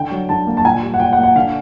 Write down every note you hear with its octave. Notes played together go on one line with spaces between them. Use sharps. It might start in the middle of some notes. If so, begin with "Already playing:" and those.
Already playing: D3 G5
F#3
D3 A5
A#3
A5
A#2 G#5
G3
F#5
A#2 G5
F#5
A#3
F#5
D3 F5